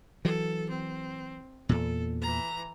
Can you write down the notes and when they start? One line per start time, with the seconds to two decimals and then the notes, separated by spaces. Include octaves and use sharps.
0.25 E3 F#3 A4
0.70 C4
1.69 E2 A#2 A4
2.22 E3 A#5